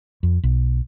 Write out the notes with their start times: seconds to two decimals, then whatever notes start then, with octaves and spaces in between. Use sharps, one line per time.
0.23 F2
0.43 B1